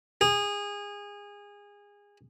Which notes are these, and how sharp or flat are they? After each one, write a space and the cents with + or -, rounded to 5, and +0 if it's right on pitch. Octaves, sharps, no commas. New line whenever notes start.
G#4 -25